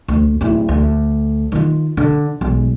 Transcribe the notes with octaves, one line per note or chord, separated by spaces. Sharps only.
D2
D1 E4
D2
D#3 F4
D3
B1 G#3